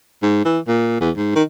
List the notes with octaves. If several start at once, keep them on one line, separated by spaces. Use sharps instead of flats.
G#2
E3
A#2
E2
G#2
D#3